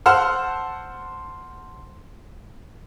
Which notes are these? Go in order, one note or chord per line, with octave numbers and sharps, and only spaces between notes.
C5 F#5 A5 E6 F6